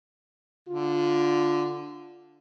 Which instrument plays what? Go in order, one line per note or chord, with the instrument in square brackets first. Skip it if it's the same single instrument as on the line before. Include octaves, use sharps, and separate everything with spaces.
[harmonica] D3 [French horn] F4